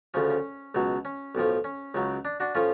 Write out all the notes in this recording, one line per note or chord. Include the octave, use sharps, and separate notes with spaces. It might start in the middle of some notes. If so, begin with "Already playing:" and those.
D2 C#3 F3 C#4
C#4
C#2 B2 F#3
C#4
B1 A2 F3
C#4
C#2 C#3 F#3
D4
D4 F#4
A2 F3 C#4 F4